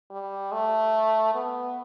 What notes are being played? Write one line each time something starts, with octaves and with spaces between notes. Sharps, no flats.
G3
A3
B3